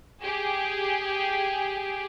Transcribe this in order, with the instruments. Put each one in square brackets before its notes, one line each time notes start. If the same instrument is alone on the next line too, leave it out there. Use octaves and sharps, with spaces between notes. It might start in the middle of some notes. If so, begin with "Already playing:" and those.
[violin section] G4 G#4